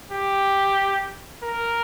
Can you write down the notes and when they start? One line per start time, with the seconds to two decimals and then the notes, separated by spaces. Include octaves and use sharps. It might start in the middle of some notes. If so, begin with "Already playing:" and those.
0.11 G4
1.43 A#4